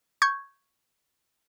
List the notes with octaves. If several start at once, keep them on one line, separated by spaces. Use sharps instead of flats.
C#6 G6 G#6